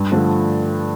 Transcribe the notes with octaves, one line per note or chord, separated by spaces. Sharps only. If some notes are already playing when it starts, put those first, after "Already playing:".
Already playing: G2
D3 F3 A3 D4